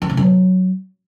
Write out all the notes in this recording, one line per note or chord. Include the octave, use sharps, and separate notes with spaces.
C4
C3
F#3